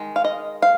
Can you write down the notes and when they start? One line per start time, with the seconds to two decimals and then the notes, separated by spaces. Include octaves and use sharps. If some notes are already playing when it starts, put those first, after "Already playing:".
Already playing: D#3 G#3
0.16 F5
0.25 D#5
0.62 F5